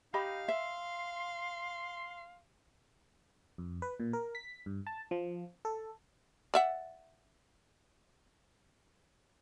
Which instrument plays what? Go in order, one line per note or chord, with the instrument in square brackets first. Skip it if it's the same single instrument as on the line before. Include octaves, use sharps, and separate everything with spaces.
[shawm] D#4 [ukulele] G4 D#5 B5 [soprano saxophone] F5
[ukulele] E5 [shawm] C6
[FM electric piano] F2
B4
A#2
A#4
B6
G2
A5
F3
A4
[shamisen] D5 E5 F#5